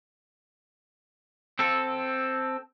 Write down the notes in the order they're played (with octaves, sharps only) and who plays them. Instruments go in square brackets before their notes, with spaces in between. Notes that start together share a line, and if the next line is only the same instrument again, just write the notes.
[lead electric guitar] C4 A4